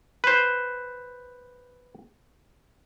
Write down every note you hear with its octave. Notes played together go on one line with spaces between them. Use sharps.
B4 C5